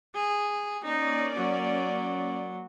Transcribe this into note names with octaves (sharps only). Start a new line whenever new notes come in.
G#4
A#3 C#4 D#4 D5
F#3